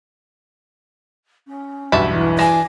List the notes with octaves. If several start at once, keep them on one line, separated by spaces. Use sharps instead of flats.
C#4
B1 E2 G2 E5 A5 B5
E3
D4 G#5 A#6 E7